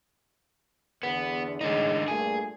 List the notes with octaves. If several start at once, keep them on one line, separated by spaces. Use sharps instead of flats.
E2 D3 B3
A2 D3 G#3 D#4
G2 A#2 A3 G#4